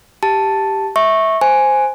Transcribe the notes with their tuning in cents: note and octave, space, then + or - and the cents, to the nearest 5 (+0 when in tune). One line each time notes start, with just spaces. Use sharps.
G4 +0 A5 +0
E5 -15 C#6 -15
C5 +0 G#5 +0